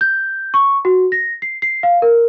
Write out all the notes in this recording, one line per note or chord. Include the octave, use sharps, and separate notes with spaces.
G6
C#6
F#4
A#6
C7
C7
F5
A#4